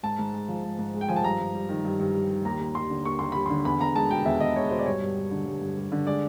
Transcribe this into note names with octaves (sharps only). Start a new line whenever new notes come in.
G#2 A5
G#2
G#3
F3
G#2
G#2
G#3
G5
F3 G#5
A5
G2 A#5
G2
G3
D#3
G2
G2
G3
D#3
D#2 A#5
D#2
G3 C6
D3
D#2 C#6
D#2 C6
G3 B5
D3 C6
E2 B5
E2 A#5
G#3 A5
B2 G5
E2 E5
E2 D#5
G#3 C#5
B2 C5
D5
G2 C#5
G2
G3
D3
G2
G2
G3
D3
G#3 D5